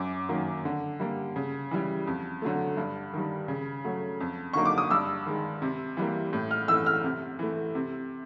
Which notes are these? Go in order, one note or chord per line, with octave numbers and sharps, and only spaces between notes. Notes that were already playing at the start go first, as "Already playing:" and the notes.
Already playing: F#2 D6
D#3 F#3 A#3
D3
G3 A#3
C#3
E3 G3
F2
D3 F#3 A3
G2
D#3 G3
C#3
F#3 A3
F2
D3 F#3 A#3 D#4 C#6
D6
D#6
G2 E6
D#3 G#3
C3
E3 G3 A#3
A2
F6
E3 A3 E6
F6
C3
E3 A3
C3